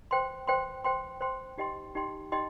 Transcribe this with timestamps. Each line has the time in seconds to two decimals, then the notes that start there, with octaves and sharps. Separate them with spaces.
0.11 C5 G5 C6
0.47 C5 G5 C6
0.84 C5 G5 C6
1.21 C5 G5 C6
1.58 D#4 G4 D#5 G5 C6
1.95 D#4 G4 D#5 G5 C6
2.32 D#4 G4 D#5 G5 C6